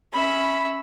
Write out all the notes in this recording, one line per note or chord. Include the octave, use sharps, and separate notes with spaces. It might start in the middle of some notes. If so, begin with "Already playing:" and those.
C#4 E5 B5